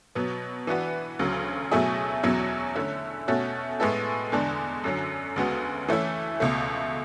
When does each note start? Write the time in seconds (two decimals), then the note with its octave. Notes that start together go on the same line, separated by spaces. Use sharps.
0.15 B2 F#3 B3
0.67 E3 B3 D4 F#4 B4
1.19 D2 C#3 F#3
1.71 B2 F#3 A3 E4 G#4
2.23 E2 B2 F#3 C#4 E4
2.76 D3 A3 C#4 E4
3.28 B2 A3 C#4 F#4 A4
3.80 A2 G#3 B3 E4 A4
4.32 E2 D3 G#3 D4
4.84 F#2 D3 F#3 C#4
5.36 D2 C#3 G#3 B3 F#4
5.89 E3 A3 C#4 E4
6.40 C#2 B2 A3